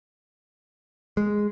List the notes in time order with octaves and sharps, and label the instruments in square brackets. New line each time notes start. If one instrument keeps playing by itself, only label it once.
[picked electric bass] G#3